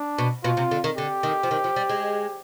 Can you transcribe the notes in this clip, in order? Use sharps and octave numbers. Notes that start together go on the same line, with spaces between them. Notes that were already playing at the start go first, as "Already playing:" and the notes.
Already playing: D4
B2
B2 F4
C3
D3
D#3
D3 G4
D#3
F3
D#3
F3
G3
G#3